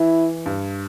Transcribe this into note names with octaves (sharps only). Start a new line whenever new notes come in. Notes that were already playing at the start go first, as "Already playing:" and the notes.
Already playing: E3 E4
G2